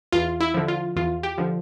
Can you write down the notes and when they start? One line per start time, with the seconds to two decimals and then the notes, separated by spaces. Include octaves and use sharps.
0.12 E2 F4
0.40 E4
0.54 D3 F3
0.68 F4
0.96 E2 F4
1.23 G4
1.38 D3 F3